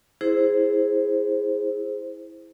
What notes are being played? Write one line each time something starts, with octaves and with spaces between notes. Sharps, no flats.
E4 G#4 C5